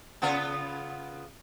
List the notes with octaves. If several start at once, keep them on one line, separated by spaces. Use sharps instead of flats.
C#3 B3 F4